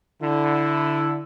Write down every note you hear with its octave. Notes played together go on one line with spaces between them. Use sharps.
D3 E4